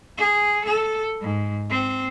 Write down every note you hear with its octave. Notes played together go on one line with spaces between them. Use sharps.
G#4
A4
G#2
C4